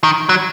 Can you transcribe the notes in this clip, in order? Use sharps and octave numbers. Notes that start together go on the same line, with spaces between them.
D#3
F#3